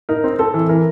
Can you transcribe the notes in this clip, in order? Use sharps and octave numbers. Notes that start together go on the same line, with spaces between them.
D#4 A#4
C4
C4 A4
E3
E3 A#4